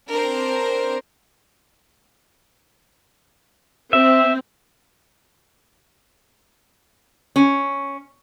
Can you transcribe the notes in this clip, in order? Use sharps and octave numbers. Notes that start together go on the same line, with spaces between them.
C4 D4 A#4 C5
C4 E5
C#4